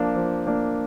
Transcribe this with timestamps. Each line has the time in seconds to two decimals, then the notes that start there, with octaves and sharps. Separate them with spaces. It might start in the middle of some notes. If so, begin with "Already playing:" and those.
Already playing: F3 A#3 D4
0.16 F3
0.47 A#3 D4